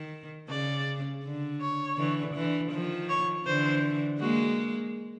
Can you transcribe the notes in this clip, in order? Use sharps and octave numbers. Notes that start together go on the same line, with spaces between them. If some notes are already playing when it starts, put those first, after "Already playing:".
Already playing: D#3
C#3 D5
D3
C#5
D3 E3
D3 E3
D#3 F3
C#5
D3 E3 C5
G#3 A#3 F#4